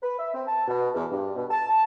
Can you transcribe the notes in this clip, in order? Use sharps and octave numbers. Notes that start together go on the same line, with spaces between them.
B4
E5
C4
A5
B2
E2
G2
B2
A5
A5